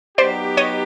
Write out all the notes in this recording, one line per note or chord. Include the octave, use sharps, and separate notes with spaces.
F#3 B3 D#4 G4 C5 D5
C#5 D#5